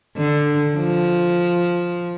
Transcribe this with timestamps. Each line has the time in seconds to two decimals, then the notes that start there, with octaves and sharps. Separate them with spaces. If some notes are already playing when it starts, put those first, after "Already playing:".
0.17 D3
0.76 F3